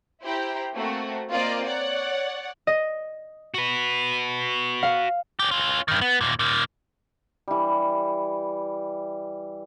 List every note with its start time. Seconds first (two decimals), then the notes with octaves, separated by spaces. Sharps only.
0.23 E4 G4 C5 G5 A#5
0.75 A3 A#3 C4 F#4
1.30 A#3 C4 F4 D5 D#5
1.66 C#5 D5 F#5
2.67 D#5
3.54 F#4 B4
4.83 F5
5.39 C#4 G4
5.51 C#4 F4
5.88 G2 D#3
6.01 B3
6.21 D#2 A#2
6.39 A#2 D#3
7.48 E3 G3